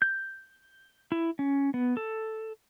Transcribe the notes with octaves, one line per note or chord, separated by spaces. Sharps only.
G6
E4
C#4
B3
A4